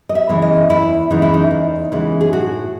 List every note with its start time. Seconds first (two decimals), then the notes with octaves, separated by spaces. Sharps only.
0.09 D#5
0.15 E5
0.29 C#3 E3 G#3 B3
0.42 D#5
0.69 E2 E4
1.10 C#3 E3 G#3 B3 D#4
1.22 E4
1.34 D#4
1.51 E2
1.92 C#3 E3 G#3 B3
2.21 G#4
2.32 A2 F#4